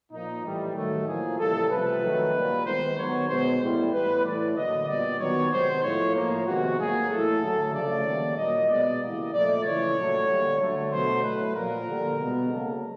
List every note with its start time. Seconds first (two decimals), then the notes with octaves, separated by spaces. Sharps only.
0.12 A#2 F3 A#3 D#4
0.44 A2 E3 G3
0.75 D#3 F#3 A3
1.07 A2 F3 A#3 G#4
1.39 C#3 E3 G3 A#3 A4
1.70 C3 F3 A3 B4
2.02 D#3 F#3 A3
2.33 A#2 G3 A#3
2.66 D#3 G#3 B3 C5
2.97 D#3 F#3 B3 C#5
3.29 B2 G#3 B3 C5
3.61 A2 E3 G3 B3
3.92 A2 E3 G3 B3 B4
4.25 A2 E3 A3 D5
4.56 D3 F#3 A#3 D#5
4.88 A#2 G3 B3 D5
5.19 D#3 F#3 B3 C#5
5.51 C3 D#3 G#3 B3 C5
5.83 A2 F3 A3 C#5
6.15 A2 F3 A#3
6.46 C3 D#3 G#3 B3 F#4
6.79 A2 F#3 A#3 G#4
7.10 A2 E3 A3 A4
7.42 D3 F#3 A3
7.73 C#3 F3 A3 D5
8.05 D#3 G3 A#3
8.37 A#2 F#3 A#3 D#5
8.69 B2 G#3 B3 D5
9.00 C#3 E3 G3 A#3 D#5
9.32 A#2 F3 A3 D5
9.64 C#3 E3 A3 C#5
9.96 A#2 F#3 A3
10.28 D3 G3 A#3
10.59 D3 F#3 A3
10.91 B2 F#3 A3 C5
11.23 A2 F#3 A3 B4
11.54 A#2 F3 A#3 A#4
11.87 D3 G3 A#3
12.19 B2 G#3 B3
12.49 C#3 F#3 A#3 A4